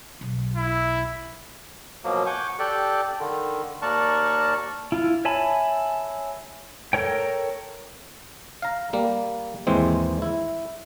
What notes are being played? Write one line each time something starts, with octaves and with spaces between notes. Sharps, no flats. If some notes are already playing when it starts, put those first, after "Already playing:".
B1
E4
B2 F3 F#3 A#3
F#5 G#5 C#6 D6 G6
G4 A4 D5 G5 F#6
D3 D#3
D#2 A#4 D5 A5 C#6 F#6
E4 F4
C#5 E5 G#5 A5 B5
A4 A#4 C#5 G5
F5 A#5
G3 A#3
D#2 G#2 E3 G#3 C4
E4